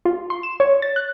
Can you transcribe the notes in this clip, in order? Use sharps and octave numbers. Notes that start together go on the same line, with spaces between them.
F4
C6
E7
C#5
A6
F#6